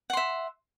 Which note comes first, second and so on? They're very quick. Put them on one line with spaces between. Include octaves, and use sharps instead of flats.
F#5 C6 E5